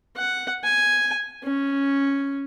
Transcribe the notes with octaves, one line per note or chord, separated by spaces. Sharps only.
F#5
G#5
C#4